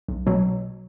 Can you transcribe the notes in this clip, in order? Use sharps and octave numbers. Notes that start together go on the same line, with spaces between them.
B1
B2 F#3